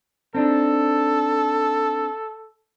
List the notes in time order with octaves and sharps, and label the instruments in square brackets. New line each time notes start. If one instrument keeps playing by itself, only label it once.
[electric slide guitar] C4 D4 D#4 [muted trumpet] A4